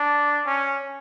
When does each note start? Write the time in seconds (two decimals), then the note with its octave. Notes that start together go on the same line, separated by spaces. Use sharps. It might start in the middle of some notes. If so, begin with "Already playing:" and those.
Already playing: D4
0.46 C#4